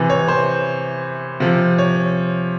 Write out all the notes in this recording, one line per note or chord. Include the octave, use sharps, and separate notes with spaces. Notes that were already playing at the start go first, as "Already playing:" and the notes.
Already playing: C3 E3
C#5
C5
C3 F3
C#5